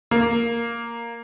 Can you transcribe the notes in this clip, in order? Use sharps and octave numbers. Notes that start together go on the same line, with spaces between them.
A#3